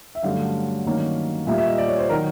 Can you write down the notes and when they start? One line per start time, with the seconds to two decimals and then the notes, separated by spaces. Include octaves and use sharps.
0.15 E5
0.23 G2 D3 F#3 A3 C#4 F5
0.85 G2 D#3 F#3 A#3 C#4
1.47 A#2 G3 A#3 E5
1.58 E5
1.68 D#5
1.78 D5
1.88 C#5
1.99 C5
2.09 D#3 F#3 A#4